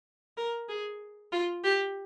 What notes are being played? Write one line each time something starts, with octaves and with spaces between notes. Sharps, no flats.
A#4
G#4
F4
G4